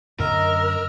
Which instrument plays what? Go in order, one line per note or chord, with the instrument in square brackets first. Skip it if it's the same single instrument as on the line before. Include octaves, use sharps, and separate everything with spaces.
[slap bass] F#2 D3 [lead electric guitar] A#4 [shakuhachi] D#5 [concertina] E6 F6